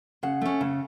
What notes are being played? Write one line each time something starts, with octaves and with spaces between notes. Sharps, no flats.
C#3 F#5
A3 C#4
C#3